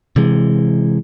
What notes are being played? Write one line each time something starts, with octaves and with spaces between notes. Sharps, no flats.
C3 E3 G#3